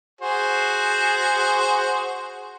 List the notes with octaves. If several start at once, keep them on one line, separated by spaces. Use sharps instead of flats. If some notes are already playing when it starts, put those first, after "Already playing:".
F#4 G#4 C5